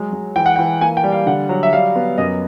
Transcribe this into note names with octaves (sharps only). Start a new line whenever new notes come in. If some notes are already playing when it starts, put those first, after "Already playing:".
Already playing: F#3 G#3
G#3
E3 G5
F#5
G5
E3
A#3 G#5
G5
G3
F5
D3 F#5
F#3
E5
G3 F5
B3
F#2 D#5